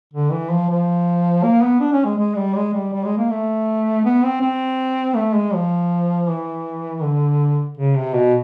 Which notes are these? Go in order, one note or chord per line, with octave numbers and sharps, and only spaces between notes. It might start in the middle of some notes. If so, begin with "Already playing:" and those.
D3
E3
F3
F3
A#3
B3
D4
C#4
G#3
G#3
G3
G#3
G3
G3
G#3
A#3
A3
B3
C4
C4
A3
G#3
F3
E3
D3
C#3
C3
B2